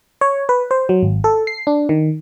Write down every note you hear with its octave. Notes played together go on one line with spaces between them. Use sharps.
C#5
B4
C5
F#3
G#1
A4
C7
D4
D#3